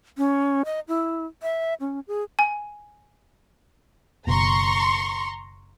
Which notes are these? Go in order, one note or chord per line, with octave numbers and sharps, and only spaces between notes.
C#4
D#5
E4
E5
C#4
G#4
G#5
F#1 B2 A#5 C6 C#6